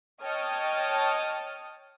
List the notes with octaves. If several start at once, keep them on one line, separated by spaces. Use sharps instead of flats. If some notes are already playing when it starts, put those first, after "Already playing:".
C#5 D#5 G5 A5 D#6 F6